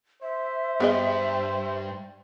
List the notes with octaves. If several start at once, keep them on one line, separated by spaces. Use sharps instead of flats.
C5 E5
G2 B3 G#4 D#5